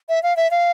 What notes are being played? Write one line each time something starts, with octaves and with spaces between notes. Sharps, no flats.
E5
F5
E5
F5